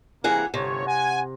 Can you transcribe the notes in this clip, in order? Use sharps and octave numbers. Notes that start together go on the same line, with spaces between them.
C3 E3 A#3 G#4 F#5
G1 C3 C#5
F#5 G#5